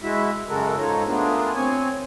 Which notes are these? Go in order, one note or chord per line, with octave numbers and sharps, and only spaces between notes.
G#3 E4 F#4 E5
F#2 C#3 G#3 F#4 A4 A#4
G#2 D#4 F4 A4 C#5 A#5
A3 B3 D4 F4 G#4 A#4
C4 C#5 G#5